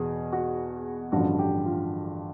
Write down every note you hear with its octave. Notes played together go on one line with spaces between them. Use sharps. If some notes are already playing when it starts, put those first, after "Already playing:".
Already playing: E2 B2 G#4
F#4
A1 G2 D3 F3 F#4
G4
F4